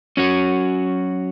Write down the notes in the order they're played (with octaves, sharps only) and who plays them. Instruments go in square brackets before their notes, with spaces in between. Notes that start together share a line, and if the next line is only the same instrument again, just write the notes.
[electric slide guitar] F#3 C#4 F#4 C#5